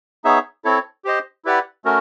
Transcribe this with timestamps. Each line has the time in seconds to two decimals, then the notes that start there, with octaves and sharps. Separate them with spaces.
0.24 B3 D#4 G#4 C#5 E5
0.64 C4 E4 A4 C#5
1.05 G4 C5 D#5
1.45 E4 G4 B4 D5 F#5
1.85 A3 C#4 F#4 A#4